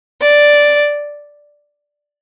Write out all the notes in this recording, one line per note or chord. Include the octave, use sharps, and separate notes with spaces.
D5